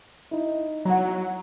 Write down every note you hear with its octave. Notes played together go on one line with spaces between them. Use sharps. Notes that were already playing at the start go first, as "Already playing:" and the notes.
D#4 E4
F#3 F#5 A#5